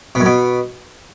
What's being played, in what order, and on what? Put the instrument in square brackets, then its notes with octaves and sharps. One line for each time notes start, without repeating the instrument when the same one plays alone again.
[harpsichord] B2
F#2
B2